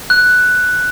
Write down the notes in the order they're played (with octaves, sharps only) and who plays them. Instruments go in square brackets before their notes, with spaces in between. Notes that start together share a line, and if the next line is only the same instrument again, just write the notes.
[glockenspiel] F#6